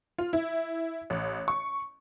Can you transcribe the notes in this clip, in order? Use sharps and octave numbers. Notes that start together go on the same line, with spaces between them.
F4
E4
A1
C#6